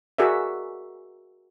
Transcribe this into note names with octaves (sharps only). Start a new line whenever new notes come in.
F#4 G#4 A#4 D5 E5